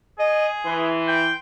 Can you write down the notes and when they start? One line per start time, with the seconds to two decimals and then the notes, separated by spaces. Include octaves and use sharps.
0.19 G#4 D#5
0.65 E3 C6
1.08 G5